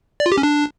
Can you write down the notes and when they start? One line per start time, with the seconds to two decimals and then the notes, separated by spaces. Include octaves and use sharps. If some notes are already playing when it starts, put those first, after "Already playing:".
0.20 D5
0.26 F4
0.32 G4
0.38 C#4
0.43 D4